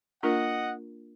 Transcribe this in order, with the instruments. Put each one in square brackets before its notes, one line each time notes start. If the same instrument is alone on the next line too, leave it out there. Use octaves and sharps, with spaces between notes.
[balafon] A#3 D4 F4 A#4 [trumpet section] D#5 F#5